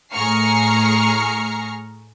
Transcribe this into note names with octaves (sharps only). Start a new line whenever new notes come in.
A2 G#4 A#5 C#6 F6 C7